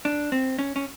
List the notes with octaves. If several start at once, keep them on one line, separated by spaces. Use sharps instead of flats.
D4
C4
C#4
C#4